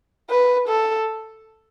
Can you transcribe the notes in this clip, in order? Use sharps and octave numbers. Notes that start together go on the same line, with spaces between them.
B4
A4